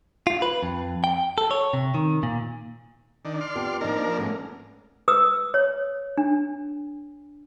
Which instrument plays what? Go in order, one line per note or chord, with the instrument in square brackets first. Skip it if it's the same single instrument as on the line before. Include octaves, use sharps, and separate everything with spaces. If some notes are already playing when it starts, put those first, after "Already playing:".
[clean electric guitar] F4
B4
F2
G5
A4
C#5
C3
D#3
A#2
[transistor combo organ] D#3 D4
D5 C6 F6
[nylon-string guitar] F2 B3 G4
[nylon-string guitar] F3 D#4 [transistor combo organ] A#3 D4 A#4
[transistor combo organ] G#2 [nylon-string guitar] A3 B3 C#4
[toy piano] B4 D#6 E6
C#5
D4